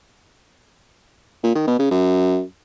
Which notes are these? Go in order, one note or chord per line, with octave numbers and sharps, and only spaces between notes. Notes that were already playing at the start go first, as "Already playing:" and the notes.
A#2
D#3
B2
C#3
F#2